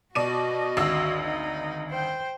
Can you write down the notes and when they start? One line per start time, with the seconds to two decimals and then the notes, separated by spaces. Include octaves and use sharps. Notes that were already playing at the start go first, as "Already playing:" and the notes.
0.15 B2 F#4 D5 D#5 D#7
0.77 G#1 D2 E6
1.22 D#4
1.90 C5 G5